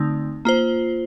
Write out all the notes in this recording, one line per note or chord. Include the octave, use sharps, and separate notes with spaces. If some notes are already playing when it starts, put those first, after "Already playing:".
Already playing: D3 A3 C4 D#4
A#3 F4 C5